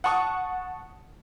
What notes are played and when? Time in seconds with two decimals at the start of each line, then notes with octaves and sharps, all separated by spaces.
0.04 F#5 A5 C#6 D#6